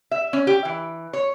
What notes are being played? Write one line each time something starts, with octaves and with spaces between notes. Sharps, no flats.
E5
C#4
G4
E3
C#5